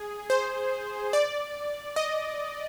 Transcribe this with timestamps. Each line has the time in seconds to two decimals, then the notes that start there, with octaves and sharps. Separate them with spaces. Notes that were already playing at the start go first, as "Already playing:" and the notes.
Already playing: G#4
0.30 C5
1.13 D5
1.96 D#5